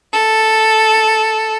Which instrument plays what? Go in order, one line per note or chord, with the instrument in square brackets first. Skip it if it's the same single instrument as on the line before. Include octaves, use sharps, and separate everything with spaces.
[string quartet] A4